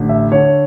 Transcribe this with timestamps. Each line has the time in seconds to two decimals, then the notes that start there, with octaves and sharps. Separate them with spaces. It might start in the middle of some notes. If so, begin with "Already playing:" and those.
Already playing: A1 D3
0.09 E5
0.31 D3 C#5